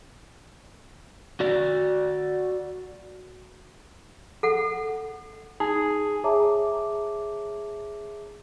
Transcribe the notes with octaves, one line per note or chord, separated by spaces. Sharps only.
F#4 D5
A4 F#5
D#4 G#4
G#4 C#5 E5 A5 A#5 D6